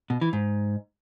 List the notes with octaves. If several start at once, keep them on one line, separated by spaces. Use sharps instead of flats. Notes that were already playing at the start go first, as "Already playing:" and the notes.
B2
E3
G#2